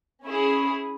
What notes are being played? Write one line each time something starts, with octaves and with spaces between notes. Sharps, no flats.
C#4 E4 G#4